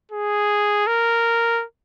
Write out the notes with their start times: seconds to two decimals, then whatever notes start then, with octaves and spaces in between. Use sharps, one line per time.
0.12 G#4
0.87 A#4